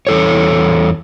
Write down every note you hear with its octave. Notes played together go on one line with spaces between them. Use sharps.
E2 A4 C#5